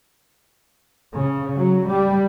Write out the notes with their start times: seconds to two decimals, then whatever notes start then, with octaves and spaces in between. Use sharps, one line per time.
1.15 C#3
1.57 F#3
1.89 G3